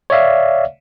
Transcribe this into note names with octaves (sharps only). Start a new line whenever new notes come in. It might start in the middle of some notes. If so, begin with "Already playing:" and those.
C#5 D5 E5 F5